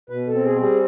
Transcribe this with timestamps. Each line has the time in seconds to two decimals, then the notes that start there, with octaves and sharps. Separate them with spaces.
0.10 B2 B4
0.27 A4
0.33 C4
0.44 G#4
0.56 G3 G#4